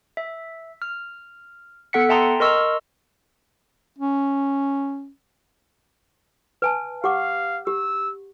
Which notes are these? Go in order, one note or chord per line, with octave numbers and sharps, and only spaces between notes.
E5
F6
B3 A4 F#5 B6 C#7
E5 G5 A5 A#5 C6 D#6
A#4 D#5 C6 C#6 E6 F6
C#4
B4 G#5 A5
G4 F5 F#5 D6
G4 E6